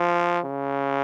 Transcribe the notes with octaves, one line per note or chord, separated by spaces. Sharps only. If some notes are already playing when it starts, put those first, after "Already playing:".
Already playing: F3
C#3